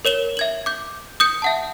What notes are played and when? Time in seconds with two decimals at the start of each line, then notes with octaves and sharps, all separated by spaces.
0.05 A#4 C#5 E7 G7
0.37 E5 G#6 F#7
0.66 D6 G6
1.20 D#6 G6 C#7
1.42 E5 F#5 A5